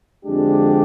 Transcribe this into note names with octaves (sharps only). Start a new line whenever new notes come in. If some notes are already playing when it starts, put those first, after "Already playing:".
F2 D3 G#3 D4 G4